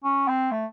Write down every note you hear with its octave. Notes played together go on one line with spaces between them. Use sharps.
C#4
C4
A3